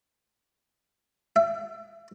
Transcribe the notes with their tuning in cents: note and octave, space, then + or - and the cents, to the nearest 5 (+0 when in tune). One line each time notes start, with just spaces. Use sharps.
E5 +30